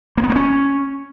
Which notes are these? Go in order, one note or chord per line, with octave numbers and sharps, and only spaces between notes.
A#3
B3
A#3
C#4